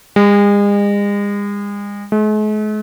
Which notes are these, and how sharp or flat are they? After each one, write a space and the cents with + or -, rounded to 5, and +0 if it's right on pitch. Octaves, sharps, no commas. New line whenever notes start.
G#3 -40
G#3 +45